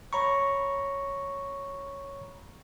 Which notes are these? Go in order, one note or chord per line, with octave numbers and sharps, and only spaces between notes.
C#5 A#5 B5 C#6